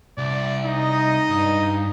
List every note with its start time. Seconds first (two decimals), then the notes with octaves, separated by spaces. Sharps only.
0.18 C2 D5
0.65 D#4 D#5
1.30 G2